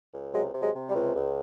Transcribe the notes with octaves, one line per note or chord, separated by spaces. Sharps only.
C#2
C3 F#3 G#3
C3
F#3 G#3
C3
G3
C#2
C#2